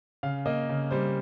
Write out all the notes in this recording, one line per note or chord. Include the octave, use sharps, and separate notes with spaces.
C#3 F5
A#3 D#5
C#3
G3 C5